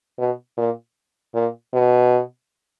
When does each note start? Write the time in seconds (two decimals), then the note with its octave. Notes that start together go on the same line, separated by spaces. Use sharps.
0.18 B2
0.57 A#2
1.34 A#2
1.73 B2